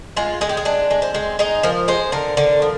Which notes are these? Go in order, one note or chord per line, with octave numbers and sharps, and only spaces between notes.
G#3 F4
G#3 G#4
G4
G#4
G#3 D4
G#3
C4
G#3
G#3 D#4
F3 A#4
G#3 C5
D3 A#4
D3
F3